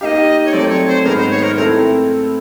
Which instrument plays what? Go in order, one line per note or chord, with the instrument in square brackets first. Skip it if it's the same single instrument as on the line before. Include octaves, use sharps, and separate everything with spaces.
[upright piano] A#3 D#4 G4 [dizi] D#5 F5
[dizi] C#5
[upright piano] F#3 A3 C4 [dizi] D5
[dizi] C#5
C5
[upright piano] G#2 D#3 G#3 B3 [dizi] A#4
[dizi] C5
C#5
A#4
[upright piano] A3 C4 E4 A4 [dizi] A#4